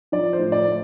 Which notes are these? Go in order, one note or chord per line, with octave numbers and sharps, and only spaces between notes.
F3 D5
C5
A2
D5
A3